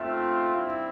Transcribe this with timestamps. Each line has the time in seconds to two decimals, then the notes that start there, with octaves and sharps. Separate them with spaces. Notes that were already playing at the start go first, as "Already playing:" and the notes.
Already playing: A3 C4 F4 E5
0.54 G3 C4 E4